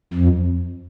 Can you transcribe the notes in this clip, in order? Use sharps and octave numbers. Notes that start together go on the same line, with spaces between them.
F2